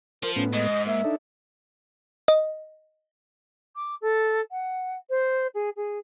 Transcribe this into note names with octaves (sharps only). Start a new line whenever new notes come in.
F3 A#4
A2 B3 C#4
G#2 D#5
A#3 E5
D4 D#4 A4
D#5
D6
A4
F#5
C5
G#4
G#4